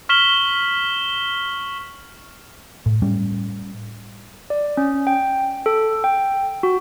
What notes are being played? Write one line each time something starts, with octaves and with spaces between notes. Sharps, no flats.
C#6 F6 B6 E7 F#7 G7
A2
A2 G3 C#4
D5
C#4
G5
A4
G5
F#4